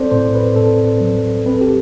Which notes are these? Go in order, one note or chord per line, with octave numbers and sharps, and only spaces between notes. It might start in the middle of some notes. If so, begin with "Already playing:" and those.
Already playing: C4 A4 C5 D5
A2 C5
B4
A2 A4
F#3
C4 B4
A4
G4